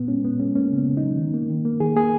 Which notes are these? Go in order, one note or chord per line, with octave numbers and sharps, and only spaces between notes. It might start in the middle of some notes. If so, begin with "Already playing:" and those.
Already playing: A#2 B3
G#3 C#4
A#2 B3
G#3 C#4
A#3 C#4
C#3
B3
C#3
D#4
F#3
D#3
A#3
D#3
A#3
D#3 G#4
A#3 G#4